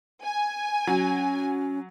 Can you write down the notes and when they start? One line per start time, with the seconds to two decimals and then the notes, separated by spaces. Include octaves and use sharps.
0.23 G#5
0.87 F#3 C#4